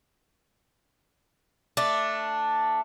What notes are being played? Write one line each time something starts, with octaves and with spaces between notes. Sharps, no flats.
A3 D4